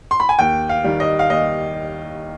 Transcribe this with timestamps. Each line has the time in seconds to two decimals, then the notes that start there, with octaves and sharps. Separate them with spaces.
0.11 C6
0.20 B5
0.29 G#5
0.39 D#2 G5
0.69 F5
0.84 D#3 G3
1.00 D#5
1.19 F5
1.30 D#2 D#5